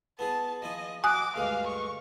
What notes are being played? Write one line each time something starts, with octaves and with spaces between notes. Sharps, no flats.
B3 E4 G#4 A5
F3 E4 D#5 G#5
F#4 G#5 D6 D#6 F#6
D2 G2 G#3 F5
C#6